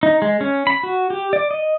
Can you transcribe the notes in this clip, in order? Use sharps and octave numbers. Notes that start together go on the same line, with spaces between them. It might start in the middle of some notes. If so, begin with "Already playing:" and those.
D#4
G#3
C#4
B5
F#4
G4
D5
D#5